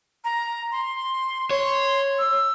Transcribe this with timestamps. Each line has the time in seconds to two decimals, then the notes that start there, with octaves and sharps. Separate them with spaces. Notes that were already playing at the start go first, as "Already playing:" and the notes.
0.24 A#5
0.72 C6
1.51 C#5 C6
2.19 E6